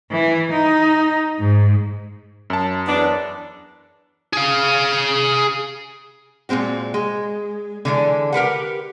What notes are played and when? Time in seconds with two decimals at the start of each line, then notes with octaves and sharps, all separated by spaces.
0.12 E3
0.53 D#4
1.39 G#2
2.50 F#2 A5
2.88 E2 B3 D4
4.33 G#4 F5
6.49 A#2 D#3 G#3 C4 F#4
6.94 G#3
7.85 D3 E3 G#3
8.33 G4 A#4 B4 F#5